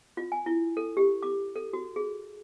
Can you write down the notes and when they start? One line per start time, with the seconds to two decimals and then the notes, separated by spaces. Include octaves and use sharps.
0.17 F4
0.32 G#5
0.46 E4
0.77 A4
0.97 G4
1.23 D6
1.56 A4
1.73 F#4
1.96 G#4